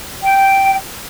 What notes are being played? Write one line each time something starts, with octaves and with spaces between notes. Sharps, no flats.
G5